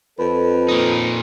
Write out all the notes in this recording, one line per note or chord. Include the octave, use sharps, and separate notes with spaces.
F2 A4 B4
A#2 D#4